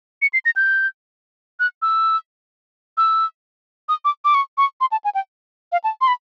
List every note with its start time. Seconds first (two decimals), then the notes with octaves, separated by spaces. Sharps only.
0.22 C#7
0.33 C7
0.45 A#6
0.56 G6
1.60 F#6
1.82 E6
2.97 E6
3.89 D#6
4.05 D6
4.25 D6
4.34 C#6
4.58 C#6
4.81 C6
4.92 A5
5.04 G#5
5.15 G5
5.72 F5
5.84 A5
6.01 C6
6.08 B5